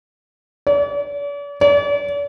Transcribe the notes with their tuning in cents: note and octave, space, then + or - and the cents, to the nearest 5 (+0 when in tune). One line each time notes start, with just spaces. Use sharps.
D5 -45
D5 -45